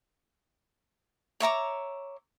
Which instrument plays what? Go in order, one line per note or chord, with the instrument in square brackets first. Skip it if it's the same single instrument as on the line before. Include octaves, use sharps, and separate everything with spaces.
[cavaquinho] C#5 E5 A#5 D6